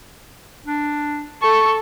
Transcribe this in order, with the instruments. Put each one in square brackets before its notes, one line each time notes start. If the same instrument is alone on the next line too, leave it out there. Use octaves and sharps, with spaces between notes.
[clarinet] D4
[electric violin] A4 [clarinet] C#6